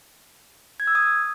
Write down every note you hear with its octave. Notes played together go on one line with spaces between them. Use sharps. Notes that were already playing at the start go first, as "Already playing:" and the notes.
G#6
E6
D#6